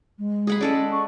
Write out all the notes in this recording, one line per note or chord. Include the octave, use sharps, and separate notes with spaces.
G#3
G#4 F#5 B5
G#3 C#4 A4 D5
C#6